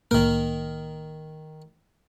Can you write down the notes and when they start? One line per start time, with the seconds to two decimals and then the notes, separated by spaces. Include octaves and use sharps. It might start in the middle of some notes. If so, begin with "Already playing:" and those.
0.11 C2 A2 D#3 A#3 A#4